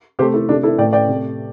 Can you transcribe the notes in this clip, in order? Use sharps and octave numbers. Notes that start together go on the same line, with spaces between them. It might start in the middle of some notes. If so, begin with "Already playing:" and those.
C3 A3 G4 C5
E4 A4
C3 A3 D4 G4
E4 A4
A2 A3 D5 G5
D5 G5
C3 A3